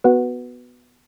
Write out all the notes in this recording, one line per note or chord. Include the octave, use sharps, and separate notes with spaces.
B3 F#4 B4 F#5